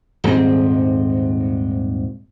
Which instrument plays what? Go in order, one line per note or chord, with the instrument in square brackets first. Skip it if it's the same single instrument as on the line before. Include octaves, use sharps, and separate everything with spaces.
[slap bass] D#1 G#2 G#3 C4